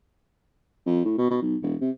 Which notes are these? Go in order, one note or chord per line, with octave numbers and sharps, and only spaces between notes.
F2
A2
B2
B2
B1
E1
C3